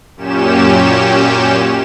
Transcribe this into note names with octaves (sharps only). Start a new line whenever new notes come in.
F#2 A#2 C#4 G4 E7